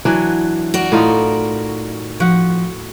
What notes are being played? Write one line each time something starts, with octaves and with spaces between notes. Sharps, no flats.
E3 F#3 D4
F#4 A#4 D5
A2 D#4 F4
F3 F#4 F#5